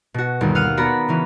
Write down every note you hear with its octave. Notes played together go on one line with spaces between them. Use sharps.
B2 F#4
G1 D#2
F5 F#5 F6 D#7
B3 F#4 D5 A#5 B5
C#3 E3 C#4